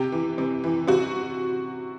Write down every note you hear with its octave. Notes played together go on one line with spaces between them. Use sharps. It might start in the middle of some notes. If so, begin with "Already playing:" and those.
Already playing: C3 G4
E3
C3
E3
C3 F#4